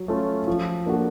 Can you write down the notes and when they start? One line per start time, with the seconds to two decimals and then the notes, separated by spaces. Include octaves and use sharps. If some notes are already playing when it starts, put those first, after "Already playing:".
Already playing: F#3
0.08 A3 C#4 F4
0.47 F3
0.86 A#3 D4 F#4 A4